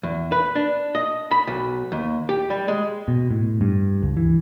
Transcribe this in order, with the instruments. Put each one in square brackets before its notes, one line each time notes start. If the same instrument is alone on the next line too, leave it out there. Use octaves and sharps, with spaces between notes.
[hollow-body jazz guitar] E2
B4
D4
D#5
B5
B1
D#2
G4
G3
G#3
[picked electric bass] B2
A2
G2
C#2
E3